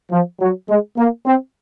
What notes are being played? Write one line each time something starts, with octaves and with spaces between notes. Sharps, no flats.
F3
F#3
G#3
A#3
C4